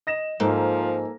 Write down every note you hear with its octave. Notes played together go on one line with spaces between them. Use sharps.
D#5 A#6 E7
G#2 F3 A#3 A4